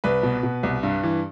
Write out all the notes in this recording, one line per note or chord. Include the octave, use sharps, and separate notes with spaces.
C2 B4
B2
B2
C2
G2
E3